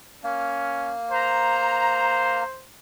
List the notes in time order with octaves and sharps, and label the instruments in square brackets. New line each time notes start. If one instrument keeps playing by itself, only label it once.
[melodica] A#3 [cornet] C#4
[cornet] C5 [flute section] A#5